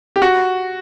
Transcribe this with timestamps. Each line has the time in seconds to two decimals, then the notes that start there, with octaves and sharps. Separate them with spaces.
0.16 G4
0.22 F#4